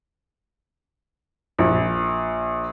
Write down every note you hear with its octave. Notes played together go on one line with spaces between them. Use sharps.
A#1